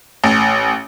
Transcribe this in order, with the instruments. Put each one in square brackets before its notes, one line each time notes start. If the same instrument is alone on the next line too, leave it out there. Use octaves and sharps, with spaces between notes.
[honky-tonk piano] A1